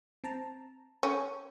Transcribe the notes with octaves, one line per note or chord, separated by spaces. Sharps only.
C4 A5 A#5
C#4 A4 G5 G#5